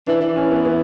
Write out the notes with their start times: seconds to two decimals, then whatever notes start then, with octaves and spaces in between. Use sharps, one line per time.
0.07 E3 D4
0.21 E3
0.36 C#4
0.51 B3
0.65 B3